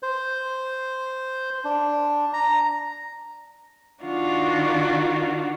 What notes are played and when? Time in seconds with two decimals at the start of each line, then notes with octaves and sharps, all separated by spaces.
0.03 C5
1.64 D4
2.33 A#5
4.04 D#3 D4 F4 F#4